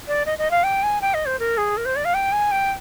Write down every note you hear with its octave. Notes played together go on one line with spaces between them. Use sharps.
D5
D#5
D#5
F5
G5
G#5
G5
D#5
C5
A#4
G#4
A#4
C5
D5
F5
G5
G#5
G5